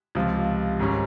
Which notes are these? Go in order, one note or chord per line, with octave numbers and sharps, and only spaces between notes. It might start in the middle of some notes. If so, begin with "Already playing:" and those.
C#2 C3 F3
G#1 G#2 G3 C#4